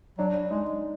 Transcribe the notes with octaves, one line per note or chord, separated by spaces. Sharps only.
F#3 D4
G#3 D#4